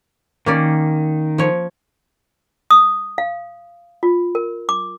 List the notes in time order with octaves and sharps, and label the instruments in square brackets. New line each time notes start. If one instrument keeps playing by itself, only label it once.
[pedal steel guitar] D#3 [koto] A#3 C#4 D5
[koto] F3 C#5
[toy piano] D#6
F5
F4
A#4
D6